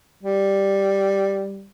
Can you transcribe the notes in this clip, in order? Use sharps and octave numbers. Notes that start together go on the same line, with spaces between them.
G3